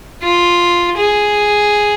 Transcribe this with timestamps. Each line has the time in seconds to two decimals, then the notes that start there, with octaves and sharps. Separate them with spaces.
0.23 F4
0.97 G#4